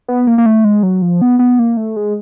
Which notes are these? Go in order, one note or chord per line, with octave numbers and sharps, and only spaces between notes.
B3
A#3
A#3
A3
G#3
F#3
F3
B3
B3
A#3
A3
G#3